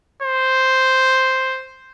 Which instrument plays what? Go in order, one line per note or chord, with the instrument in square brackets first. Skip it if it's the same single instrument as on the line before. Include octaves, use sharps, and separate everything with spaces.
[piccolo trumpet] C5